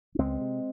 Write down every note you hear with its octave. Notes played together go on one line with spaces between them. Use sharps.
C#4
C#2 G#3 C4
C3